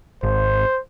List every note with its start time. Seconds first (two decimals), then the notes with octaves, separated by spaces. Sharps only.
0.23 G#1 C5